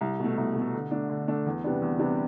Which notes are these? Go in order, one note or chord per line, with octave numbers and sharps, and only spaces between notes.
C2
B2 A3
C2
B2 A3
D3
A3 D4
D3
A3 D4
E2
C3 G3 B3 D4
E2
C3 G3 B3 D4